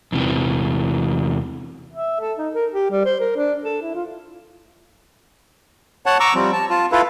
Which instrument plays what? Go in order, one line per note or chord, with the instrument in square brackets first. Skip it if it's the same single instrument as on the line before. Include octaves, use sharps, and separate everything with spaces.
[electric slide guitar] E2 C3 E3
[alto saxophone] E5
A4
D#4
A#4
G4
G3
C5
A#4
D4
A4
E4
F4
[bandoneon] C#5 F#5 A5
A#5 C#6 D6 E6
F3 G3 C4
A5
F4 A5
E4 F4 A4 B4 F5